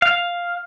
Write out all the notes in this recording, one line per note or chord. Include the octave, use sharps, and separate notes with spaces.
F5